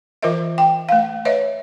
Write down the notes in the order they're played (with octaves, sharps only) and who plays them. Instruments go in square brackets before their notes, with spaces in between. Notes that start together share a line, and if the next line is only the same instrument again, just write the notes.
[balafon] E3 F4 A#4 C5 D#5 E5
G5
A3 F5
B4 C#5 D#5 E5